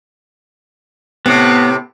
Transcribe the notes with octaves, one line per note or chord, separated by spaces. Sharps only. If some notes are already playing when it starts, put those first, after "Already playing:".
A2 C3 B3